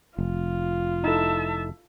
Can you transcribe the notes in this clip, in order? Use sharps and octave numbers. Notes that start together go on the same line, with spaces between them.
F1 F4
D#4 E4 A4 E5 A5